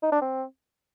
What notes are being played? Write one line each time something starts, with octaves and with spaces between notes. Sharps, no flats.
D#4
D4
C4